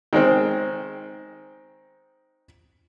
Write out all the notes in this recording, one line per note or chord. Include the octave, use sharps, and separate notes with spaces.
D#3 G#3 C4